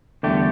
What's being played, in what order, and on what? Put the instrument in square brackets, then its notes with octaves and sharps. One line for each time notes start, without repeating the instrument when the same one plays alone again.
[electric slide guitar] E2 D3 G3 A3 G4